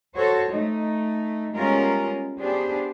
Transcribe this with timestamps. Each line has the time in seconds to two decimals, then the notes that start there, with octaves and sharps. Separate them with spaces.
0.14 F#4 A4 C5 C#5
0.51 A3 D#4
1.53 G3 G#3 B3 C#4 F4 A#4
2.39 B3 D4 G4 G#4 C5